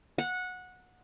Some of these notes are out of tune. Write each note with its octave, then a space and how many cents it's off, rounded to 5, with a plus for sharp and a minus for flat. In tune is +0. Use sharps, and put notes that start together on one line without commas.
F#5 -15